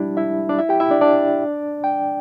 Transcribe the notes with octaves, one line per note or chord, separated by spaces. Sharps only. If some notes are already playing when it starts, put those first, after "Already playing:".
Already playing: G3 D4 E4 G4
E4 E5
D4 D5
E4 E5
G4 G5
E4 E5
D4 D5
D4 D5
G5